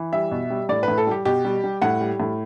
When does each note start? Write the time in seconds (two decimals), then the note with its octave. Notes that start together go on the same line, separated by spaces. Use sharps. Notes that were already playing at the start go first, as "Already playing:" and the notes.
Already playing: E3
0.13 G3 E5
0.31 B2
0.50 G3
0.69 A2 D5
0.83 B4
0.88 A2
0.98 A4
1.07 G3 G4
1.25 B2 G4
1.45 G3
1.64 G3
1.82 A2 F#5
2.01 G3
2.20 A2